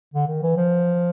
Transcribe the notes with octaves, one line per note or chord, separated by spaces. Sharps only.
D3
D#3
E3
F3